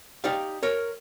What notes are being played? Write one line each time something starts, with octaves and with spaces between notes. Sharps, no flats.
D#4 G4 D5 F5
A#4 C#5